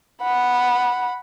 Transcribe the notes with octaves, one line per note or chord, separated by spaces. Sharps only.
F#5 B5